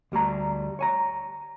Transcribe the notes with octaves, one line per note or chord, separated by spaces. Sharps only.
D2 G3 A3 A#5
C#5 G#5 A#5